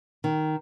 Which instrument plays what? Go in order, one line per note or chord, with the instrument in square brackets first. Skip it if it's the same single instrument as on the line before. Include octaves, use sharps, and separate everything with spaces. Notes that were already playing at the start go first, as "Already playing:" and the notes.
[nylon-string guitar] D#3